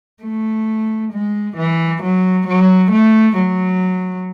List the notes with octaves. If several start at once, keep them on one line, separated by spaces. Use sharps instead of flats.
A3
G#3
E3
F#3
F#3
A3
F#3